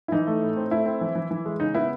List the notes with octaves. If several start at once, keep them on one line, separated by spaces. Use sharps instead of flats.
E4
E3 D#4
A3
A2
C4
A3 E4
C4
E3
E3
E3
G#3
C#3 D#4
B3 E4